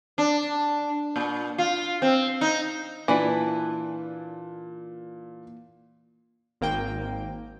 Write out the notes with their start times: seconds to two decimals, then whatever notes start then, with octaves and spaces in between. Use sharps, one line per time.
0.18 D4
1.16 A#2
1.58 F4
2.02 C4
2.41 D#4
3.08 A#2 E3 D4 B4
6.61 G#1 A#3 G5